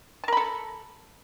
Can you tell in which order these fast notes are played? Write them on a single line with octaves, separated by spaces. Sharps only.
A5 A#4 B5 A4